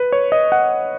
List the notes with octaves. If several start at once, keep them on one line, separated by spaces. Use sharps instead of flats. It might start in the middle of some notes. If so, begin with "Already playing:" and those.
Already playing: B4
C#5
D#5
F#5